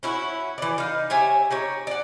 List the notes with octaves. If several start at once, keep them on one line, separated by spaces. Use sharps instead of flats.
C#4 E4 F#4
E3 D5
D#4 F5
G4 C#5 E5 G#5
D#4 G4 C#5
D5 F#5